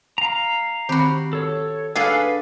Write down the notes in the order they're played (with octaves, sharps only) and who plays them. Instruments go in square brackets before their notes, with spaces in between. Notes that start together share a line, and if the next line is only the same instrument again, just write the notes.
[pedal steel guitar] F5 A#5
[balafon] D#3 C4 B5 [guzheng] F#4 G4
[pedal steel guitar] A4 C#5
[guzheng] D4 G#4 A4 [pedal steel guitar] B4 [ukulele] F5 F#5